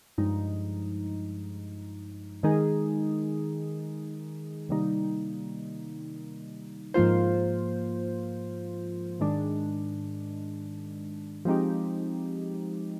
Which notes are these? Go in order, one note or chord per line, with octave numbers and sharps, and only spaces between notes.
G2 F3 G#3 D#4
D#3 G#3 D#4 G#4
C3 D#3 G3 A#3 D#4
G#2 F3 A#3 F4 C5
G#2 D#3 G#3 D4
F3 G#3 C4 D#4 G4